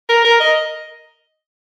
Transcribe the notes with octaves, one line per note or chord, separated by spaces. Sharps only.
A#4
A#4
D#5